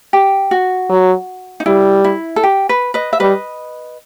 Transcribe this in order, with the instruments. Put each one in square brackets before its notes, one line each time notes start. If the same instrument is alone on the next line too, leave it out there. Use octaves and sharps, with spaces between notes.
[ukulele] G4
F#4
[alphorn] F#3
[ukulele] D#4
[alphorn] G3 [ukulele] E4
[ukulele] E4
A4
G4
B4
B4 D#5
E5
[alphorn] G3 [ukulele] B4 D#5